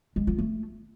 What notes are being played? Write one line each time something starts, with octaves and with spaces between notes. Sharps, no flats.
G#3
F4
A3